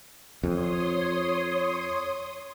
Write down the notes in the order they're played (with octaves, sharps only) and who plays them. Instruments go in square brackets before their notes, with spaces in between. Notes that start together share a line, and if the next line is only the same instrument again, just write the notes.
[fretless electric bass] F2 [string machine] C#5 C6 D#6